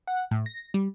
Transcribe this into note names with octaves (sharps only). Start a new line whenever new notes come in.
F#5
A2
A#6
G3